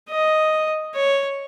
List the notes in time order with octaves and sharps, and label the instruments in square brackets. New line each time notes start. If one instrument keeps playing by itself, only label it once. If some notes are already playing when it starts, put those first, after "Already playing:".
[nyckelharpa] D#5
C#5